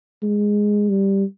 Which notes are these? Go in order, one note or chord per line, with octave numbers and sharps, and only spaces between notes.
G#3
G3